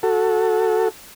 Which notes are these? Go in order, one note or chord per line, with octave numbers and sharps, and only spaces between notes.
F#4 A4